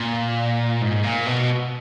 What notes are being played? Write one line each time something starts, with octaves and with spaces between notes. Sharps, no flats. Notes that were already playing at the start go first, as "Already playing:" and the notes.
Already playing: A#2
G#2
A#2
B2